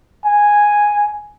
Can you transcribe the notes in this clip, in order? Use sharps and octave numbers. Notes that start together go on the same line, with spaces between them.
G#5